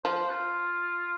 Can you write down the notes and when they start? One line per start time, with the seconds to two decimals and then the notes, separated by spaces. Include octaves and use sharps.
0.05 F3 C5
0.30 F4